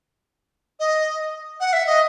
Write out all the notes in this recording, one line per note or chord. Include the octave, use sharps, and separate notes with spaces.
D#5
F#5
E5
D#5